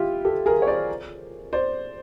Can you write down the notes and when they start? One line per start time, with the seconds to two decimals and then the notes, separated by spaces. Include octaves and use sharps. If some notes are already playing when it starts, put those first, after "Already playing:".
Already playing: E4 F4 G4
0.25 G4 A4
0.46 G#4 A#4
0.62 C#5
0.67 C5 D5
1.53 C5 D5